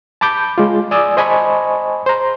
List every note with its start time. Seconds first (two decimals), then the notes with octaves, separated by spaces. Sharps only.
0.21 A5 B5 D6 G6
0.58 G#3 F4
0.91 D5 G#5 D#6 E6
1.17 C5 D#5 G#5 A5 B5 C#6
2.06 C5 A#5